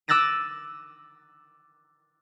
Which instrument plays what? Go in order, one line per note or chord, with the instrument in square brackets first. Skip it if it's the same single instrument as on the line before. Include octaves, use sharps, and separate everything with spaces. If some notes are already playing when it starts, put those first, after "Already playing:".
[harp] D6 E6 F#6 A6 A#6 D#7